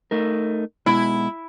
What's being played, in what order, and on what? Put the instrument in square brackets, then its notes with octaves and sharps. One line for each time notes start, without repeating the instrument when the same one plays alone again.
[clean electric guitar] A3 D#4 A#4
[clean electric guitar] B1 B2 G#3 [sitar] E4